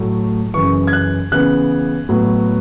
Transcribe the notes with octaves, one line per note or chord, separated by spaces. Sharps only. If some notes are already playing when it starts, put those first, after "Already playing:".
Already playing: A2 F#3 A3
F#2 C#3 E3 C#6
G#6
F#6
C#3 E3 B3 F#6
A2 F#3 B3